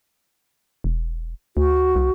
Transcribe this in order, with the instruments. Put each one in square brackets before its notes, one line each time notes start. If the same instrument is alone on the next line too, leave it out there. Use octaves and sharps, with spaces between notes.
[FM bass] E1
[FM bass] D2 [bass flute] F#4
[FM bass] C2